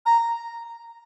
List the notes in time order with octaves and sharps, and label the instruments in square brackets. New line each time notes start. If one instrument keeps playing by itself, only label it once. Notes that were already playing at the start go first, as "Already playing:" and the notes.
[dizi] A#5